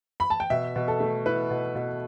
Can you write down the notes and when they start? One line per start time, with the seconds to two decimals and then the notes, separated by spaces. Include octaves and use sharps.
0.20 B5
0.30 A5
0.40 G5
0.50 B2 E5
0.76 B2
0.88 A4
1.00 A3
1.26 E4 B4
1.51 B2
1.75 B2